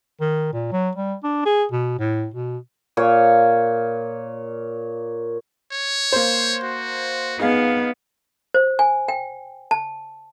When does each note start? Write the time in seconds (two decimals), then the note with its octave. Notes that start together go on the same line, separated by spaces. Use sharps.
0.21 D#3
0.53 A#2
0.72 F#3
0.96 G3
1.24 D4
1.46 G#4
1.72 B2
1.99 A2
2.34 B2
2.97 A#2 C#5 F5
5.73 C#5
6.12 A#3 C5
6.64 F#4
7.39 B3 D#4 G#4 F5
8.54 C5
8.79 G#5
9.08 G5
9.71 A5